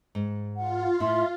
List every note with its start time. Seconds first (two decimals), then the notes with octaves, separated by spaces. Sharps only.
0.15 G#2
0.57 F4 F#5
1.00 A2 E4 E5 C6